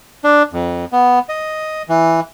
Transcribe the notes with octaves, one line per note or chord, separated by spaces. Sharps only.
D4
F2
B3
D#5
E3